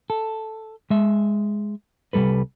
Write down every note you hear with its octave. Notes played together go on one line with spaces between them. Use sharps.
A4
G#3 E5
C2 C#3 G3 A4 B4